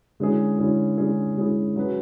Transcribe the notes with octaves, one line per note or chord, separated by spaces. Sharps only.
D3 G#3 C#4 E4 G#4
D3 G#3 C#4 E4 G#4
D3 G#3 C#4 E4 G#4
D3 G#3 C#4 E4 G#4
F#3 C#4 G#4 B4